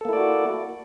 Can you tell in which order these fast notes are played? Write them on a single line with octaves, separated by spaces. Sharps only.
A4 A#3 E4 D5 F#4